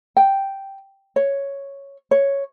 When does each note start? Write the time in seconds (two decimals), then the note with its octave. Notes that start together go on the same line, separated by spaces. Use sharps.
0.17 G5
1.16 C#5
2.11 C#5